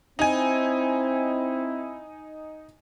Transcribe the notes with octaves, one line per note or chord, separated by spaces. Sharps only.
C4 D#4 E4 G#5